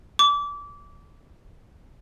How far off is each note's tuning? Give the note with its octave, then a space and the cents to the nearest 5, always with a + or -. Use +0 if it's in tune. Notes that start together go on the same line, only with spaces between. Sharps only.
D6 -25